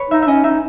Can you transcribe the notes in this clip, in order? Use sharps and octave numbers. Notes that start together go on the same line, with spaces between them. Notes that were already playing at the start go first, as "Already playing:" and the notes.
Already playing: B4 C#5
D#4 E5
E5
C#4 D#5
D#4 E5